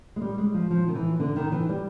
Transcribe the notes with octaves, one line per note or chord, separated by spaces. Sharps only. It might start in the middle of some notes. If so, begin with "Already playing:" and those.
G#3
G3
G#3
F3
F3
D#3
E3
D3
D#3
E3
G3